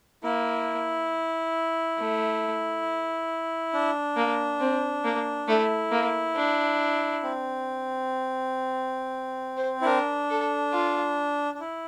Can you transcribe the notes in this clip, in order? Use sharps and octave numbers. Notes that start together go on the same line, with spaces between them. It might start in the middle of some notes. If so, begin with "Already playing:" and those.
A#3 E4
A3
D4
A#3
C4
A#3
A3 E4
A#3
D4
C4
C5
E4
D4 A#4
A4
F4
D4
E4